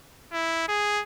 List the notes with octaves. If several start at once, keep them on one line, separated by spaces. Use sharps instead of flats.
E4
G#4